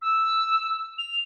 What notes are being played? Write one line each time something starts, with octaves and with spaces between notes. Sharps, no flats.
E6
F7